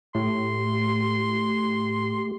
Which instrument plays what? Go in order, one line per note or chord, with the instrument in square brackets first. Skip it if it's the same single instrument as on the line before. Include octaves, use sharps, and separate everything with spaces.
[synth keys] A2 [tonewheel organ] A3 G4 [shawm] C6